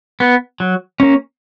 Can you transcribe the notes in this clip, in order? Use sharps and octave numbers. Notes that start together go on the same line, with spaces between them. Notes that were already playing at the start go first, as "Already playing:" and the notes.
B3
F#3
A#3 C#4